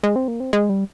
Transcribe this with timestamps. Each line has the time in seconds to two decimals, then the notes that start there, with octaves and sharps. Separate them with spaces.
0.03 G#3
0.16 C4
0.28 A#3
0.40 C4
0.53 G#3
0.69 G3